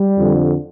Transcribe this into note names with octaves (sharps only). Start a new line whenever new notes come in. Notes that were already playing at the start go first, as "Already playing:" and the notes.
Already playing: G3
F2 D3